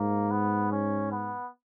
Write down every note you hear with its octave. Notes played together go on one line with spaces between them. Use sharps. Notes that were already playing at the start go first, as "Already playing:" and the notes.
Already playing: G#2 A#3
B3
C#4
B3